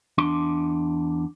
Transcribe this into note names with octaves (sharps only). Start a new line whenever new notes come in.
E2 D4 C6